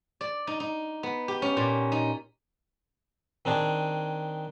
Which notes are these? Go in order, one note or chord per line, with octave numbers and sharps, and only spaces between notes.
D5
D#4
D#4
B3
G4
C#4
A#2
D#4
D#3 C4 D4 G#4